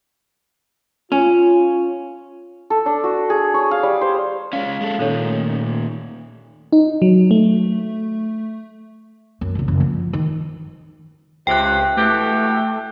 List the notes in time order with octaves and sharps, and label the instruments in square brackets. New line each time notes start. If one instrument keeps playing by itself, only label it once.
[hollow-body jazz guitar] C#4 [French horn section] F4
[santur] A4
D4
F#4
G#4
C#5
F5
G3
C5
[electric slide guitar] G#3 C#4 [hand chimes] F5
[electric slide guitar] G#3 A4
[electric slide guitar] A#2 D#3 [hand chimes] C#4 A4 C#5
[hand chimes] A3
[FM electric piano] D#4
F#3
A3
[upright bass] F#2
F1 C2
F#1
F3
D#3
[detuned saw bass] C#2 [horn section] G2 C3 [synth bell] G5 F#6
[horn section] B2 E3 G4 [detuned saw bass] A3